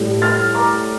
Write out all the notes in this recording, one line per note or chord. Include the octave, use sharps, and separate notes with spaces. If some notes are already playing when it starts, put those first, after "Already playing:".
Already playing: A2 G3
F6 A6
A#5 D6